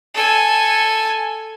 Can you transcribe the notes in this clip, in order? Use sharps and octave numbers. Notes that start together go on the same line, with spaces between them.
A4 G#5